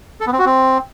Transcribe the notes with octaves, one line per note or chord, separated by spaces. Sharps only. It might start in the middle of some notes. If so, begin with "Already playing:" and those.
A4
B3
C4
F#4
C4